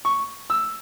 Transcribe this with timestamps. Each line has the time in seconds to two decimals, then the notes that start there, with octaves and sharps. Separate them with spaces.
0.05 C#6
0.50 E6